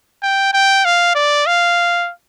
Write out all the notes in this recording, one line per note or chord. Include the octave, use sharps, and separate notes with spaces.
G5
G5
F5
D5
F5